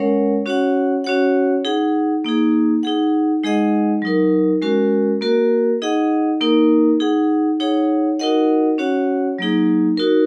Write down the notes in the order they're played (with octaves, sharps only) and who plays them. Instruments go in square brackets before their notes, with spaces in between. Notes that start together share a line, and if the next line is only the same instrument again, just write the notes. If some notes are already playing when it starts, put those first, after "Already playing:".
Already playing: [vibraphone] G#3 C#4 A#4 C#5 F#5
C#4 F#4 C#5 F#5
C#4 F#4 C#5 F#5
D#4 G#4 F#5
A#3 D#4 G#4
D#4 G#4 F#5
G#3 D#4 G#4 D#5 F#5
F#3 D#4 A#4
G#3 C#4 F#4 A#4
A#3 F#4 A#4
D#4 G#4 D#5 F#5
A#3 D#4 A#4
D#4 G#4 F#5
D#4 G#4 C#5 F#5
D#4 F#4 A#4 D#5 F#5
C#4 F#4 C#5 F#5
F#3 A#3 D#4 G#4
D#4 F#4 A#4